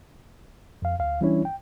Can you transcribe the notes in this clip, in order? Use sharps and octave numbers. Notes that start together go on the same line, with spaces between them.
F2 F5
D2 F5
E3 G3 C#4 D4 E4 C#5
G5